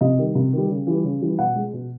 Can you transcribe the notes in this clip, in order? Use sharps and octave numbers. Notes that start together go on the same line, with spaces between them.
C3 D#5
D#3 G3
C3
D#3 G3
C#3
E3 G3
C#3
E3 G3
B2 F#5
G#3
B2